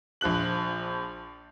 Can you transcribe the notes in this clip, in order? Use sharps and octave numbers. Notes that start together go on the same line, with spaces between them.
A#1 F3 F#6 F#7